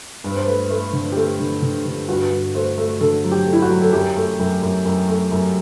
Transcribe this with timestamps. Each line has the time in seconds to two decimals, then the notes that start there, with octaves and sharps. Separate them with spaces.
0.24 G2 B4
0.35 C5
0.46 A3 B4
0.70 A3 A4
0.93 D3
1.12 G4
1.16 A3 A4
1.39 D3
1.62 D3
1.86 D3
2.09 G2 F#4
2.31 G2
2.55 A3 C5
2.78 A3
3.01 D3 A4
3.24 F#3
3.32 G4
3.47 A3
3.53 E4
3.62 F#4
3.70 F#3
3.82 A4
3.93 F#2 G4
4.16 A3
4.39 F#2
4.63 F#2
4.85 F#2
5.08 A3
5.31 F#2